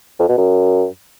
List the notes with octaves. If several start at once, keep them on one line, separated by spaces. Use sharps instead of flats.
F2
B2
F#2